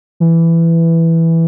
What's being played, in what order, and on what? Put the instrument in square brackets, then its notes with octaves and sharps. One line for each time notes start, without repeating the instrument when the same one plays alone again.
[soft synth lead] E3